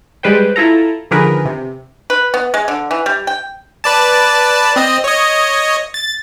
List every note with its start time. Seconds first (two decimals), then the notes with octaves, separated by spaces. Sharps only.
0.23 G3 G#3 B4 C5 G5
0.56 E4 F4 A4 A#5
1.11 D3 D#3 F3 G#4 A#4 B4
1.45 C3
2.10 B4
2.34 B3
2.54 G#3
2.68 D3
2.91 E3
3.06 G3
3.27 G5
3.84 B4 D5 A5
4.76 C4 D#5
5.04 C#5 D#5
5.94 A6